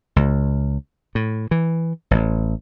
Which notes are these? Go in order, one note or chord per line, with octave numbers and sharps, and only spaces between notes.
C#2
A2
E3
A1